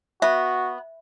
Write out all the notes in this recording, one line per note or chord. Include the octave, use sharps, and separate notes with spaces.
B3 F#4 E5